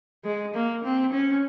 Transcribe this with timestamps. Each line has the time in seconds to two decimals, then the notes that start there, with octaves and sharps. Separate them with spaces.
0.24 G#3
0.54 A#3
0.84 C4
1.13 C#4